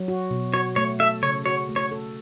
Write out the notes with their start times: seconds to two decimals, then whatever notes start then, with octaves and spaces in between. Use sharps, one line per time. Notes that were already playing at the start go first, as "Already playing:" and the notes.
Already playing: F#3
0.08 F#4
0.31 B2
0.54 F#4 C#5
0.76 A3 C#5
1.00 A4 E5
1.23 C#3 C#5
1.46 F#4 C#5
1.69 A3
1.76 C#5
1.92 A4